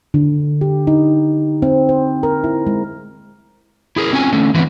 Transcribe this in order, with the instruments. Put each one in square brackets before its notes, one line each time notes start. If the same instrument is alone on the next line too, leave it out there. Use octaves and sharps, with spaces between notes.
[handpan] D3
G4
D#4
C4
C5
A#4
E4
G#3
[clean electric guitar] E4 G#4 A#4
C4 C#4 F4 G#5
D3 A3 C#4
E3 G#3 B3 C4 D4